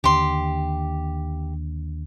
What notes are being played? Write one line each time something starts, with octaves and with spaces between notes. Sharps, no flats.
D#2 D3 G4 C6